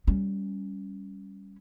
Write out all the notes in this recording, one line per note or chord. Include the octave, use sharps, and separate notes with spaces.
G3 C#4